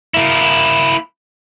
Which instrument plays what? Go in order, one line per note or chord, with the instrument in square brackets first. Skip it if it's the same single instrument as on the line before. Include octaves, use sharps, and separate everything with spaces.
[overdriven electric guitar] A#3 E4